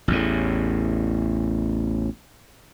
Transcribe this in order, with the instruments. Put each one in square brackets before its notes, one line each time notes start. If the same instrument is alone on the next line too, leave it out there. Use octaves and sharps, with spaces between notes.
[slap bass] A1 E2 A2